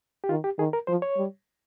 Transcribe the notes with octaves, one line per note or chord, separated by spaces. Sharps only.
G4
D#3 F4
G4
D#3 G#4
A#4
F3 C5
C#5
G3